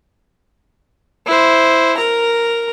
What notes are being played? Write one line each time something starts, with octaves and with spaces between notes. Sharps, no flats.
E4 C5
A#4 A#5